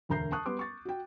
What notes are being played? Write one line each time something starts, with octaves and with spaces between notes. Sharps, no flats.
E1 D2 A#4 A#5 G6 C7
A5 C#6 D#6 F#6
G3 B3 B4 C6 D6
C#6 A6
F#4 G5